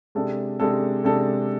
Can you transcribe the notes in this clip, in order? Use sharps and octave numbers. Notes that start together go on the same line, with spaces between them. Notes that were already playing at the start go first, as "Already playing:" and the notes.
C3 G#3 D4 A4
C3 G#3 D4 A4
C3 G#3 D4 A4